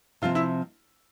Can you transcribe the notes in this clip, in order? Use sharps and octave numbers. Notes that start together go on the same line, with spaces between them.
C3 F3 C4 F4
E4